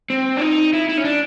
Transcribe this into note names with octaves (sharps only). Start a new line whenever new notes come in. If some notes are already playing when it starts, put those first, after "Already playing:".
C4
D4
D#4
E4
E4
C#4
D4